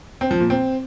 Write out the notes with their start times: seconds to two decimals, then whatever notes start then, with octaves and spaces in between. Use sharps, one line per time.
0.21 C4
0.31 F3
0.40 A#2
0.50 C4